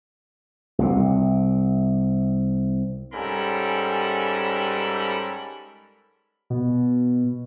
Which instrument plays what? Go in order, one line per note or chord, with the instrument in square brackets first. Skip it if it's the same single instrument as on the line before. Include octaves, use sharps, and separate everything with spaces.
[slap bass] C2 C3
[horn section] G#2 G3 C#4 A4 A#4 B5
[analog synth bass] B2